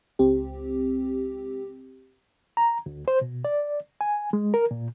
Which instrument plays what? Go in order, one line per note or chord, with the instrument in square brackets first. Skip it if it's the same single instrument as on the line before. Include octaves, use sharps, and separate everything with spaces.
[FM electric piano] C#2 C4 G4
[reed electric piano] A#5
D2
C5
B2
D5
G#5
G#3
A#4
A#2